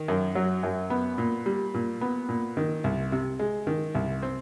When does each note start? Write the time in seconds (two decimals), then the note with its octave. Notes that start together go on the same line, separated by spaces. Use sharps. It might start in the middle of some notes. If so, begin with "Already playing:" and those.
Already playing: D#3
0.08 F#2
0.35 F#3
0.63 F#2
0.90 B3
1.18 A#2
1.46 G3
1.74 A#2
2.01 B3
2.29 A#2
2.57 D#3
2.84 C2
3.12 C3
3.39 G#3
3.67 D#3
3.95 C2
4.23 C4